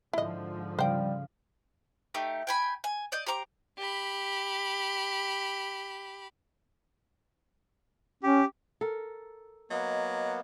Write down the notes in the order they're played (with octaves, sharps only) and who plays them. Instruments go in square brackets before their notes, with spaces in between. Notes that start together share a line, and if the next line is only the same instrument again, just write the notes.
[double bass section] G#2 D3 F3 [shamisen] E4 D#5
[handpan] C#3 F5 [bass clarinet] G3 [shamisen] C5 G5
[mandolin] A3 D#4 G4
G5 G#5 B5
G#5
D5 D#5 G6
G4 C5 A#5 D6
[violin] G4 B5
[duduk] C#4 [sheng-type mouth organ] G4
[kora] A4 A#4
[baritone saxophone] F#3 [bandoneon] A#3 B3 [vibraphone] D#5